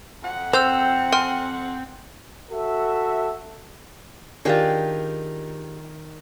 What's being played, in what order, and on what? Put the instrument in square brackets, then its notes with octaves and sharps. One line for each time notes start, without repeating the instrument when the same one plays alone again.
[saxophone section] F2 F#5
[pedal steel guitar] C4 [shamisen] C5 [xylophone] E6 G6 F7
[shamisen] G5 [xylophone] G#5 C6 F6
[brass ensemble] F#4 A4 E5
[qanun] D#3 D4 G5 [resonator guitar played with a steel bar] F4 G4 G#4